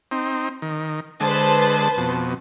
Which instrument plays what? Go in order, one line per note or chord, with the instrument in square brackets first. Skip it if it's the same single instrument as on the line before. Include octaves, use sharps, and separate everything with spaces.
[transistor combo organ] C4 D#4
D#3
[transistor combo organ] D3 G#3 [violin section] B4 C5 A5
[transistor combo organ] F2 B2